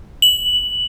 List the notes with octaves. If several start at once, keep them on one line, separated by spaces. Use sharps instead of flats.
F#7